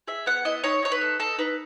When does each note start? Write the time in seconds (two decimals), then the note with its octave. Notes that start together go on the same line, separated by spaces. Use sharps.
0.08 G#4 E5
0.26 B3 F#5
0.45 E4 D#5
0.64 D#4 C#5
0.82 D#4 C#5
0.92 B4
1.01 A4
1.19 D#4 A4
1.38 D#4 B4